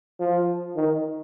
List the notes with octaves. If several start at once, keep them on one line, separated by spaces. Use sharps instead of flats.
F3
D#3